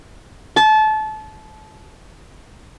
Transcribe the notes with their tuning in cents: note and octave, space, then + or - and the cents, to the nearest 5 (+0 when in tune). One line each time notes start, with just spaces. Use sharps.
A5 -25